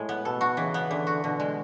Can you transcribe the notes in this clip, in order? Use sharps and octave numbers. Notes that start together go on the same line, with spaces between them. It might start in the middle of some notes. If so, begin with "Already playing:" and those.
Already playing: A2 G#3
B3
B2 A4
F#4
C#3 E3
B3
D3 E3
F#4
B2 D3
G#3